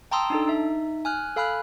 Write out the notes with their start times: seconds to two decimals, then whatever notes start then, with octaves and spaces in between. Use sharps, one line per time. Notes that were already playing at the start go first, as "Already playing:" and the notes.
0.11 G5 A5 A#5 C6 D#6 E6
0.30 D4 D#4 A4
0.48 D#4 E5
1.05 G#5 F6 F#6
1.36 A4 F5 G#5 B5 F6 F#6